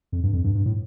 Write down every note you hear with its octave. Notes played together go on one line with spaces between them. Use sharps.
F2
G2
F2
G2
G2
A2